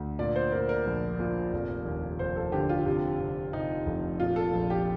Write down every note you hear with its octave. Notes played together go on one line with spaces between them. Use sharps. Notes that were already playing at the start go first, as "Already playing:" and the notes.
Already playing: D2
A#2 D5
C5
A#2 A#4
A#4
A#1
A#2
F1
D#2
F1 C5
A4
D3 G4
F4
C3
C3
C3 D#4
F1
A#2 F4
A4
A#1
G4